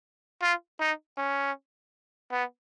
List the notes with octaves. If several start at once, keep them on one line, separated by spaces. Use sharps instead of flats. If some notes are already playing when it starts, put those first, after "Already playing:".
F4
D#4
C#4
B3